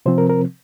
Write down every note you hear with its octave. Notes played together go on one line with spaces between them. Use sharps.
C3 F3 C4 C5
A#4
A#4